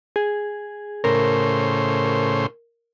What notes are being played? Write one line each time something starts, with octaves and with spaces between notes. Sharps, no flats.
G#4
A2 C#3 A#4 C5